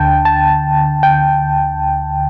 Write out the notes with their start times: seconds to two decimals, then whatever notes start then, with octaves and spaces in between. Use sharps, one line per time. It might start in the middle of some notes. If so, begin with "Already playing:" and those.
Already playing: D2 D3 G5 A5
0.25 A5
1.03 G5